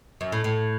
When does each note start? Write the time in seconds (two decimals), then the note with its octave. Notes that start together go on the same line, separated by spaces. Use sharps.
0.21 F#2
0.32 A2
0.44 A2